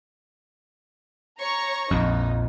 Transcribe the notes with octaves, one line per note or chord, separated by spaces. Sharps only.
C#5 A#5 C#6
A#1 F2 D#4